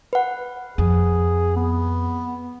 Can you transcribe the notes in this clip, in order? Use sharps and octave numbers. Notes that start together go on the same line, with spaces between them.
B4 F#5
F2 G#4
B3